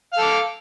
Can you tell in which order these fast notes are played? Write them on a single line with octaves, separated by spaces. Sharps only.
F5 A4 D6